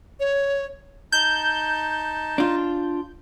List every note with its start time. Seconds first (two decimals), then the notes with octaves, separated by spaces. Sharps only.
0.20 C#5
1.12 D#4 A5 G6
2.38 D4 F4